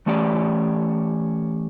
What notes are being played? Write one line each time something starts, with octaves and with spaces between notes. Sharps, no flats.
E3 A3 C#4 G4 D5